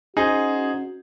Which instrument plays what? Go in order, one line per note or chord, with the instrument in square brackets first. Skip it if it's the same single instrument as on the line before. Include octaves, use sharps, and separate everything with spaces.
[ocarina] C#4 [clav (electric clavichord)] D#4 [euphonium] F#4 [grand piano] G#4 C5